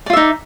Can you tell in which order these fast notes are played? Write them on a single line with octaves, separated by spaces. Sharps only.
D5 F4 E5 D#4